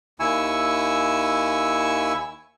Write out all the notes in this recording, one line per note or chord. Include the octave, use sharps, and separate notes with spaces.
D#2 E4 G#5 C#6 E6